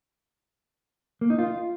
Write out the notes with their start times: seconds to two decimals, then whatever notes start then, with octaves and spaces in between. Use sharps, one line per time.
1.21 A#3
1.30 D#4
1.39 F4